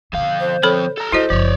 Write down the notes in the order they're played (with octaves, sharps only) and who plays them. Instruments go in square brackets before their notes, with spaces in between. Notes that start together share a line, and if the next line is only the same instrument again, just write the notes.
[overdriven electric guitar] F2 F5 [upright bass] B2 D3
[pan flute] C5
[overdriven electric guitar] F2 C4 [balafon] A4 C#5 B5
[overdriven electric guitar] A4 A#5
[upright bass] F#3 [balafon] E4 F#4 D#5 [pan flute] C5
[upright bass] F#1 [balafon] F3 [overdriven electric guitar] C#5 D5